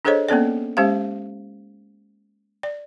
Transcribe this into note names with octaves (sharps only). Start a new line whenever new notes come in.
D4 G#4 A4 C5 C#5 D#5
A#3 B3 C#4 A4 D5
G#3 C#4 G4 C5 F5
D5